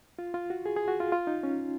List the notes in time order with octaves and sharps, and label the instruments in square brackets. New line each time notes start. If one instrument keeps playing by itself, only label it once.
[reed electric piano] F4
F4
F#4
G#4
G#4
F#4
F4
F4
D#4
C#4